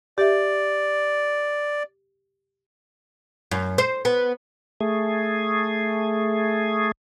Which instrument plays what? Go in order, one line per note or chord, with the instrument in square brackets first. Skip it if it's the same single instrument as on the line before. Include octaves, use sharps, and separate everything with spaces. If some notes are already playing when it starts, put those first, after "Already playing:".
[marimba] G4 E5 [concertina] D5
[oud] F#2
C5
B3
[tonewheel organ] A3 G#4